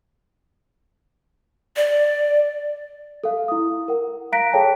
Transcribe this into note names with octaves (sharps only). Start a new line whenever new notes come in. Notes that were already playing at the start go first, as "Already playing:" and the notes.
D5
A4 F5
E4 D#6
A#4 F#5
F5 A#5 F#6 A#6 B6 D7
G#4 A4 C#5 G5 A5